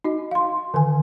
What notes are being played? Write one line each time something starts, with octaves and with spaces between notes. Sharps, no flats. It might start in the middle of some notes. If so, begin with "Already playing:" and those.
D#4 F#4 D#5
F5 C6
D3 D#3 G#5